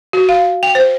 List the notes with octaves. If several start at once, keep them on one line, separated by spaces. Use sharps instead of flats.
F#4
F5
G5
C5